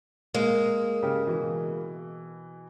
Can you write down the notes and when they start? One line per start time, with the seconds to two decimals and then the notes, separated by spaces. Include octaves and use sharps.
0.34 G#3 A#3
1.03 C#3 G4
1.27 B2 E3